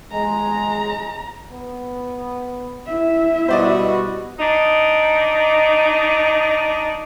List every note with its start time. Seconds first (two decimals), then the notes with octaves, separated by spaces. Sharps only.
0.12 G#3 A#5
1.53 B3
2.86 E4 E5
3.48 B2 G3 B3 F#4 C5 D5 D#5
4.39 D4 D#4